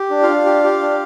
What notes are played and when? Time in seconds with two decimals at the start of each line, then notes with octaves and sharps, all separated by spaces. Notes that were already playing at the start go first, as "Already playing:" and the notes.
Already playing: G4
0.11 D4
0.23 F4 F5
0.29 D4
0.45 G4
0.64 G4
0.82 D4